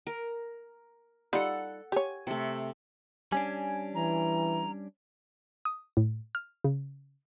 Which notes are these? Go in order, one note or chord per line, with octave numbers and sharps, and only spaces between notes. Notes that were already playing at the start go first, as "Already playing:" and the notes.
A#4
G3 D#4 F4 A4 F#5
G4 C#5 G#5
C3 A3
G3 C#4 D4 G#5
E3 A#5
D#6
A2
F6
C#3